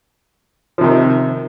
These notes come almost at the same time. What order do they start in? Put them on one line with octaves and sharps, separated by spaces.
F3 C3 D#3